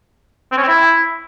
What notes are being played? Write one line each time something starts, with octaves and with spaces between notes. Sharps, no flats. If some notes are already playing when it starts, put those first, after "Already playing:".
C4
C#4
C4
E4